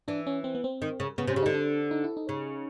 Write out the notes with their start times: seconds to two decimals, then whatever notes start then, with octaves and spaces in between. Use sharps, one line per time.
0.08 E3 D4
0.27 C#4
0.44 C4
0.55 B3
0.64 C4
0.82 D#3
1.00 C#3
1.18 C#3 B3
1.27 C3
1.30 C#4
1.36 C#3
1.43 D3 D#4
1.54 D4
1.91 D#4
2.04 E4
2.17 D#4
2.29 C#3